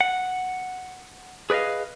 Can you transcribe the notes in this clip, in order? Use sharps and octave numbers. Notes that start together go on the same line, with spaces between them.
F#5
G#4 B4 D5 D#5 F5